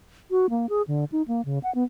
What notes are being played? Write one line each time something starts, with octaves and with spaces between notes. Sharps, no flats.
F#4
A#3
G#4
D3
D#4
A#3
C#3
F#5
B3